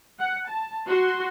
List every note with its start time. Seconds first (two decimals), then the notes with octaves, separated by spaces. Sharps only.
0.19 F#5
0.48 A5
0.86 F#4 C6